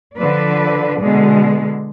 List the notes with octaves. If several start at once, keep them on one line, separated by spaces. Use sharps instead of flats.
D3 F3 B4 D5
B2 D3 G#3